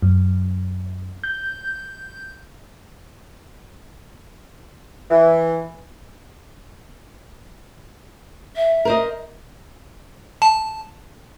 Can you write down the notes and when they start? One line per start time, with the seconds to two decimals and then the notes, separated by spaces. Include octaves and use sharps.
0.02 F#2
1.24 G6
5.10 E3
8.56 E5
8.85 A#4 C5 D#5
10.42 A5